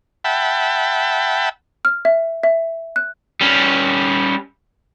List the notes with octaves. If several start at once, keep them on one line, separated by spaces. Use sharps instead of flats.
E5 F#5 G5 A5 B5
F6
E5
E5
F#6
G3 C#4